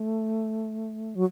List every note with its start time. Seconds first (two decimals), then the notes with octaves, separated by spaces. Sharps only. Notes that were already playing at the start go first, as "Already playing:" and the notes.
Already playing: A3
1.15 F#3